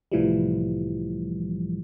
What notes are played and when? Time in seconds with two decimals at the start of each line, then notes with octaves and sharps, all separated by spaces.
0.12 C2 A2 E3 F3 G3